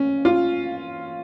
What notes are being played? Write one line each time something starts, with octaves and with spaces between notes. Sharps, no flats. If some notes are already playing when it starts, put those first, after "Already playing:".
Already playing: C#4
F4